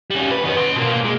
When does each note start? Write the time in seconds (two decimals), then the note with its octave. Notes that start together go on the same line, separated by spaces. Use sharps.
0.11 G3 C#4
0.31 B4
0.44 D#3 B3
0.56 C#4 C6
0.76 B2 A#3
1.04 G#3